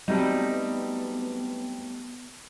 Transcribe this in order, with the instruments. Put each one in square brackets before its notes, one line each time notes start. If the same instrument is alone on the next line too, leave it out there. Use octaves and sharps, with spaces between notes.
[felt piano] F#3 C4 [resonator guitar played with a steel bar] G3 A3 D#4 [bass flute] B3